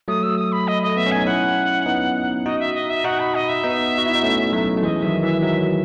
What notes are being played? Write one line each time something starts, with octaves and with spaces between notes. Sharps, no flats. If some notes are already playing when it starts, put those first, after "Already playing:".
F#3 A3 D#6
E6
D#6
B5
D#5
A3 D#5
B3 E5
C#4
D#4 G#5
C#4 E4 F#5
B3 D#4
D#4 F#4 D#5
E5
D#5
E5
D#4 F#4 F#5
B5
D#5
E5
B3 D#4
F#4
E4
D#4
A3 C#4
F#3 A3
A3
E3 G#3 D#5
D#3 F#3 E5
E3 E5
D#3 F#3 E5